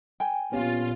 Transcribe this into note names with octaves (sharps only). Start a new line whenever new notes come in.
G5 G#5
A#1 A#2 B3 C#4 F4 G4